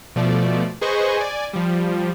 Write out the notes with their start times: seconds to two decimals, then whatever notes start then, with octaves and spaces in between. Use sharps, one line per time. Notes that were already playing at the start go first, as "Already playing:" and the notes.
0.16 B2 F3 A3 D5
0.81 G#4 B4 C5 D#5 C#6
1.17 D5 G#5
1.53 F3 G3